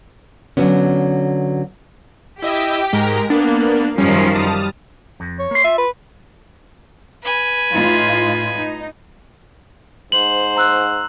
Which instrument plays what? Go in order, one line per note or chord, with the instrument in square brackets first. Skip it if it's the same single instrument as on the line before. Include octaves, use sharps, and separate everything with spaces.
[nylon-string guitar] D3 F#3 B3 C#4
[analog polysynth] E4 D#5 E5 [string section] G4
[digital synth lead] G#2 [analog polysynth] G#3 A#4 A#5
[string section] A#3 [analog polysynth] B3 [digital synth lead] D4
[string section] F#2 D#3 F3 [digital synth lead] G3 [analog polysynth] C#4
[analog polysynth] A5 D#6 F6
[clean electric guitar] F2
[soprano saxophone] C#5
[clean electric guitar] A#3 C6
[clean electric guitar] F4 [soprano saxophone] E5
[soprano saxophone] B4
[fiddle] B4 G#5
[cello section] A2 D#4 F4
D#4
[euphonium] G#2 [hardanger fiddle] C5 [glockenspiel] F#7
[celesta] A#5 E6 F#6